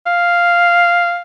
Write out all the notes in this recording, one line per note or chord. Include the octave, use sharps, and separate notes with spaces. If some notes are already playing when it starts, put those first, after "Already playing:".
F5